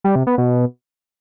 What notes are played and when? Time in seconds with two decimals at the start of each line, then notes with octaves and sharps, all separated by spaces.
0.04 G3
0.16 C3
0.27 B3
0.38 B2